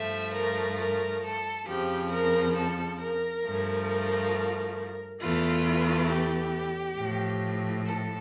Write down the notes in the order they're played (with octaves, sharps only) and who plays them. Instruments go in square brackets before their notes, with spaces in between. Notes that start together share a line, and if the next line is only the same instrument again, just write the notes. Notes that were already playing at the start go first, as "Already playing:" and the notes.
Already playing: [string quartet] G2 F3 A3 E5
A#4
A#4
A4
F2 C#3 F3 G4
A#4
A4
A#4
G2 F3 A3
E2 E3 A3 F4
G4
A2 F3 A3
A4